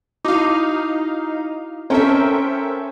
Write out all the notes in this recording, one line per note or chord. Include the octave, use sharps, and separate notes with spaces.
D#4 E4 F#4 F5 D6
C#4 A4 A#4 C5 E5 G5